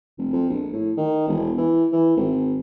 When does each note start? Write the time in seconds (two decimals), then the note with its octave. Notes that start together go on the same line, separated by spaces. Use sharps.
0.18 F1
0.33 F2
0.50 A#1
0.73 A2
0.97 D#3
1.27 E1
1.58 E3
1.92 E3
2.17 G#1